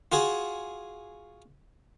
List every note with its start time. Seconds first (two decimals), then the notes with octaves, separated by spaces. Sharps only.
0.12 F4 F#4 G#4